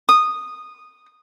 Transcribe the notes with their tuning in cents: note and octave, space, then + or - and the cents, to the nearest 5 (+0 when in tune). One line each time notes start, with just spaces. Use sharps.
D#6 -10